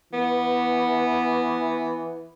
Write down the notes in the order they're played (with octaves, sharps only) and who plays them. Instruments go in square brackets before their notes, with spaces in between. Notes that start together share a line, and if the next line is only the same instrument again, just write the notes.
[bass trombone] E3 [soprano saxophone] B3